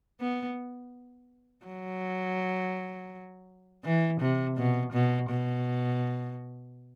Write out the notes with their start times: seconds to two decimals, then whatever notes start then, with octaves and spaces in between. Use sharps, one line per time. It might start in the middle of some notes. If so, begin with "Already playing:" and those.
0.20 B3
1.66 F#3
3.84 E3
4.21 C3
4.57 B2
4.93 B2
5.30 B2